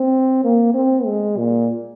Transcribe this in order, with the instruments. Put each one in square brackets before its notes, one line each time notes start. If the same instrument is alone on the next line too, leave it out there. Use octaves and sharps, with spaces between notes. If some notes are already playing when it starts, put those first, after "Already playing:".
Already playing: [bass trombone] C4
A#3
C4
G#3
A#2